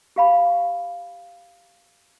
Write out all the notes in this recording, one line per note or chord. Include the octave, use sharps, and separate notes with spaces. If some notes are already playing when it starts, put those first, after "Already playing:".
G4 F5 B5